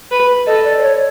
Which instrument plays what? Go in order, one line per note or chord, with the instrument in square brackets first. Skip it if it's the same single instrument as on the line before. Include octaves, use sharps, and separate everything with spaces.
[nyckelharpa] B4
[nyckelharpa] A4 [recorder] D#5
[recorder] D5
C5
C#5